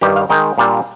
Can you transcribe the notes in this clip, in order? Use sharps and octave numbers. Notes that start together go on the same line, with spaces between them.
G2 D#3 G3 G4
F5
D#3 G#3 D#4 G5
A#2 G3 D4 F4